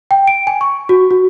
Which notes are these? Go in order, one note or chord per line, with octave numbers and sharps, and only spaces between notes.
G5
D7
G#5
C#6
F#4
F#4